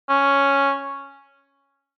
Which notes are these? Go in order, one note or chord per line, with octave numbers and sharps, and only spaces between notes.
C#4